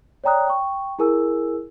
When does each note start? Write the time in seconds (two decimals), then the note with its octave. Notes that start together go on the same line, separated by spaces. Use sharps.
0.24 C#5 D5 G5 A#5 D#6 F#6
0.47 G5 C#6
0.99 E4 G#4 A#4 G#5 E6